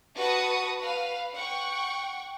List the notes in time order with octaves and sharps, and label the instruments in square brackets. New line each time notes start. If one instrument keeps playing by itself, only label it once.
[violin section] F#4 B4 A5 C#6 D#6
B4 F5
F#5 G5 C#6